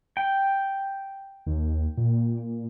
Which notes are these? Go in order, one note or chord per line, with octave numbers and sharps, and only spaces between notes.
G5
D#2
A#2